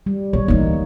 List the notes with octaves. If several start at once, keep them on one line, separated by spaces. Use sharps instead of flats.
G3
A#1 C#5
D2 E3 A#3 D#4